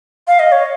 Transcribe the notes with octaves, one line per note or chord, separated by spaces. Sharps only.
F5
D#5
C#5